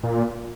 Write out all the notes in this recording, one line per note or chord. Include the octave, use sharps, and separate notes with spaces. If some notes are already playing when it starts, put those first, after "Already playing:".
A#2